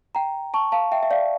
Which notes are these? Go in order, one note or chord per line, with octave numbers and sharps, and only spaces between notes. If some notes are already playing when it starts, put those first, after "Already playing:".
G5 A#5
A5 C#6
F5 A5
E5 G5
E5
D5 F5